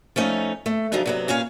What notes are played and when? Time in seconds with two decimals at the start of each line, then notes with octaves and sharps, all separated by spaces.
0.16 F3 A3 C#4 D#4
0.66 A3
0.92 C#3 F3 F#3 D4 D#4
1.06 C3 F#3 B3
1.28 A#2 C#4 C#5 F5